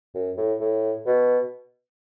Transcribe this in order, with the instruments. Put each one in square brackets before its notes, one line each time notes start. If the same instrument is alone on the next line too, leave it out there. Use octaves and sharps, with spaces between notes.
[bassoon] F#2
A2
A2
B2